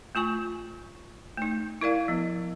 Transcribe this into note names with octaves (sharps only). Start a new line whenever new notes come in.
A3 F4 G#5 C#6
A3 D#4
E4 A#4 D5 F5
F3 B3